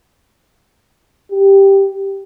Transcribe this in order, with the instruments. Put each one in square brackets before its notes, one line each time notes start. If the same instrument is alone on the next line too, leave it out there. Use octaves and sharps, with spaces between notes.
[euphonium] G4